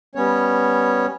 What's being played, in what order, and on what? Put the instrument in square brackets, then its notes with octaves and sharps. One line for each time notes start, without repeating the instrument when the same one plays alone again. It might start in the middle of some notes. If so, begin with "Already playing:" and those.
[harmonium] G3 B3 C#4 C#5